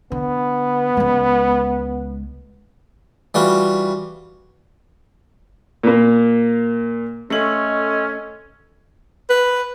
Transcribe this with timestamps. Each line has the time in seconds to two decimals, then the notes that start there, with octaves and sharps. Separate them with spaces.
0.12 D3 B3
0.97 C#2 G#3
3.34 E3 G3 F4 F#4
5.83 A#2 A#3
7.30 A3 C#4 A4 D#5 C6 E6 F#7
9.30 B4